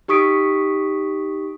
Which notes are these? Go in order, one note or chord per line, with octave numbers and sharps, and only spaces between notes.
D#4 G4 C#6 D#6 B6 D7